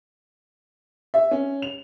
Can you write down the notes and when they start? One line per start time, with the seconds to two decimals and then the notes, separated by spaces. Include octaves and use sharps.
1.14 E5
1.31 C#4
1.62 F7